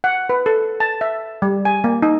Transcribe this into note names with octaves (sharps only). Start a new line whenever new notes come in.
F#5
B4
A4
A5
E5
G3
G#5
A#3
D#4